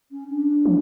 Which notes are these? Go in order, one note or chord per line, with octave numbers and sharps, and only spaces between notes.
C#4
D4
F3